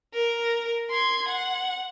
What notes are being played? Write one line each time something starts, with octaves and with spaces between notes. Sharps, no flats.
A#4
C6 G#6
F#5